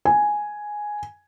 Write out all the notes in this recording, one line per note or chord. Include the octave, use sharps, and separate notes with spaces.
G#5